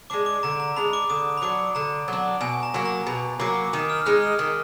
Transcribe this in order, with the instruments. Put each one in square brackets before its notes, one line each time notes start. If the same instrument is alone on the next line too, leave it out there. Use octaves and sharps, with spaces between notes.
[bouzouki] G#3 D4 [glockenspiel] D6
[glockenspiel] D6
[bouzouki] D3 [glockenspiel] A#5
[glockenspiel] A#5
[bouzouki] G#3 D4 [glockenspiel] B5
[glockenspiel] D6
[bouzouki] D3 [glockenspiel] D#6
[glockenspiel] B5
[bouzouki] F#3 D4 [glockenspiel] D6
[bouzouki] D3 [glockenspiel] A#5
[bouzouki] F#3 D4
[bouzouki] B2 [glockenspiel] G#5
[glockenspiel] A#5
[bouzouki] F#3 A#3
[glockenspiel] A#5
[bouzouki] B2 [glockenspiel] B5
[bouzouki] F#3 A#3 [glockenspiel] D6
[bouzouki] D#3 [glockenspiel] D#6
[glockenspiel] F6
[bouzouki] G#3 D#4 [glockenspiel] F#6
[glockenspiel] F6
[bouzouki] D#3